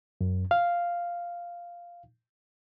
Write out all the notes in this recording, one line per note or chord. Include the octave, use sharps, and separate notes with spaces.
F#2
F5